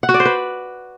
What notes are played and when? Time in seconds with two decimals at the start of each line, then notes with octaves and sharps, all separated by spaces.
0.03 F#5
0.09 F#4
0.14 D5
0.20 C5
0.25 B4